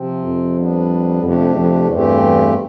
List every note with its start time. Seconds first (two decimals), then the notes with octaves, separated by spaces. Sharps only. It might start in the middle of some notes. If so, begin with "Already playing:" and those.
Already playing: C3 F3 C4
0.23 F2
0.56 G3 B3 D4
1.22 F2 C3 F3 A3 D4 G4
1.55 F2
1.88 E2 G2 E3 A3 C4 G4
2.20 E2